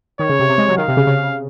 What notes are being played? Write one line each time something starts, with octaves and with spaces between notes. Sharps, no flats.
D#3 C#5
C#3
C3
C3
G#3
F#3
D#3 F5
C3
C#3
C#3